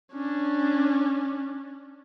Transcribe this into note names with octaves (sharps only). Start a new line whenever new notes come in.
C#4 D4